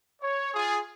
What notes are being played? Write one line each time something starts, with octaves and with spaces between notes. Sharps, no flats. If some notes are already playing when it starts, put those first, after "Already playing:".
C#5
F4 G#4